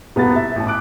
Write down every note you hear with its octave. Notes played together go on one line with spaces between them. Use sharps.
D#1 B3 E4 F#4 A6
E5
A1 A5
D6 D#6 F#6 D7